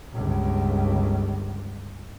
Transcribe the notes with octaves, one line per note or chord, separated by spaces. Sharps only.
G1 C#2